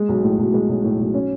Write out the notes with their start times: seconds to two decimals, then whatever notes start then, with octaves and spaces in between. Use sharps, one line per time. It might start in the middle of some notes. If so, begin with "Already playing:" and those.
Already playing: G#3
0.08 B1
0.23 A2
0.39 B1
0.54 G#3
0.69 B1
0.84 A2
1.00 B1
1.14 C#4